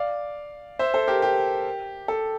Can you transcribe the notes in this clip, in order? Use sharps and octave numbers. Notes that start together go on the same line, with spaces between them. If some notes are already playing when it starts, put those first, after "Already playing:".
Already playing: D5 F5
C5 E5
A4 C5
G4 A#4
G4
A4